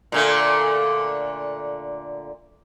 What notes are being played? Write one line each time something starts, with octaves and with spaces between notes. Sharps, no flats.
A#2 D3 A3